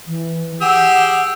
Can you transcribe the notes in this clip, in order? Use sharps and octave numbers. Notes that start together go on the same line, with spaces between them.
E3
G4 G#4 F#5 E6